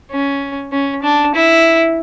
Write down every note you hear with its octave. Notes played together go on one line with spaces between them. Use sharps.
C#4
C#4
D4
E4